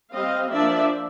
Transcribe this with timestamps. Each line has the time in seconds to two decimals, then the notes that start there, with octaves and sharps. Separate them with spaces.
0.13 G3 C4 D#5 F5
0.51 F3 A#3 D4 D5 E5